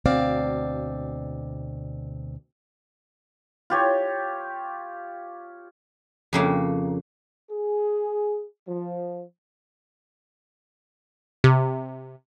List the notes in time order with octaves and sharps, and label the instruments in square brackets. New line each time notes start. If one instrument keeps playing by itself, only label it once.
[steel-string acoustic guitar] D2 B2 C4 D5 F5
[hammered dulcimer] F4 G4 C#5
[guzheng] F2 C#3 A#3
[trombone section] G#4
F3
[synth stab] C3